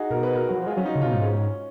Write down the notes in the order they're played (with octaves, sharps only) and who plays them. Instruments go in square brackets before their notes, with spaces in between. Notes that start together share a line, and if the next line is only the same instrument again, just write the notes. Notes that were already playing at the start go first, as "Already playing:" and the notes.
Already playing: [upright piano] D#4 F#4 G#4
[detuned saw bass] B2 [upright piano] A#4
[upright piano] B4
A#4
[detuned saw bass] F#3 [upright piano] F#4
[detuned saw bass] F3
[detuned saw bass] G#3 [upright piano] F4
[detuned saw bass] F#3 [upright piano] C#4
[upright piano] D#4
[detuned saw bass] C#3
[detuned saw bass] B2 [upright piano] F4
[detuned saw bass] G#2 [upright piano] D#4
[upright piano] C#4